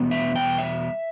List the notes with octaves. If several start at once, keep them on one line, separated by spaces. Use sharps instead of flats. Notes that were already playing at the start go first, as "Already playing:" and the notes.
Already playing: E2 B2 G3 B3
E5
G5
E5